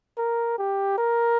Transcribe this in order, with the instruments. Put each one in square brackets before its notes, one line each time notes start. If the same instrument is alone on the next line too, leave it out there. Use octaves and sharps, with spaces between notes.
[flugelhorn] A#4
G4
A#4